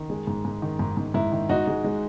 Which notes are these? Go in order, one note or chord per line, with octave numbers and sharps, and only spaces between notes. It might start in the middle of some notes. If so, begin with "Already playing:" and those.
Already playing: D#3
G#3
G#2
G#2
D#3
G#2
G#2
G#2 E4
D#3
G#2 D#4 F#4
G#3
G#3